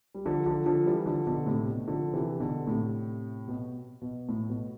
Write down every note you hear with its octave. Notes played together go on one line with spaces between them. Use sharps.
G3
D3 F3
D3 F3
D3 F3
E3 G3
D3 F3
B2 D3
A2 C3
B2
D3 F3
C3 E3
B2 D3
A2 C3
B2
B2
A2
B2